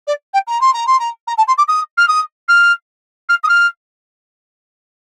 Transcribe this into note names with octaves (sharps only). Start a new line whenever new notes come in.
D5
G5
A#5
C6
A#5
C6
A#5
A#5
A5
C6
D6
D#6
F6
D#6
F6
F6
D#6
F6